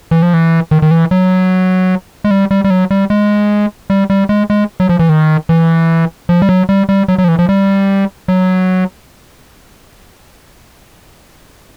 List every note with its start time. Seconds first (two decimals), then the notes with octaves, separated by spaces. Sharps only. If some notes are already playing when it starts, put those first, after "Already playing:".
0.11 E3
0.22 F3
0.34 E3
0.71 D#3
0.82 D#3
0.91 E3
1.11 F#3
2.24 G#3
2.31 G3
2.51 G3
2.64 G3
2.70 F#3
2.91 G3
3.10 G#3
3.90 G3
4.10 G3
4.29 G#3
4.50 G#3
4.80 F#3
4.89 F3
4.99 E3
5.09 D#3
5.49 E3
6.29 F3
6.42 G3
6.49 F#3
6.69 G3
6.89 G3
7.08 F#3
7.18 F#3
7.24 F3
7.28 E3
7.39 F3
7.49 G3
8.28 F#3